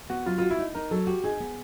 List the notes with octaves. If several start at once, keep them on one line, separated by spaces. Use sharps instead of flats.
B3 F#4
F#3 F4
F4 F#4
E4
D#4
D#4 A#4
F#3 A4
F#4 G4
D#4 G#4
B3